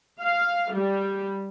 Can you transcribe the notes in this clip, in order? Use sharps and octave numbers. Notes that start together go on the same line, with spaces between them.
F5
G3